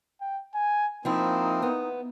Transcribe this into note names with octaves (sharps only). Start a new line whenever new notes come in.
G5
G#5
F3 A#3 C4 D#4 E4
B3